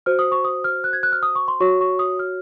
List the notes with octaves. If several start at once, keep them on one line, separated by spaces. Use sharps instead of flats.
F#4 C5 F6
D#6
C#6
D#6
F6
F#6
G#6
F#6
F6
D#6
C#6
C6
F#4 C#5 C#6
C#6
D#6
F6